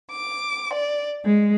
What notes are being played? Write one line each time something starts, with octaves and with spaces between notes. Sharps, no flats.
D6
D5
G#3